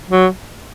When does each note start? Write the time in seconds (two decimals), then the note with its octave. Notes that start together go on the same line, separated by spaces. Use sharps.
0.10 F#3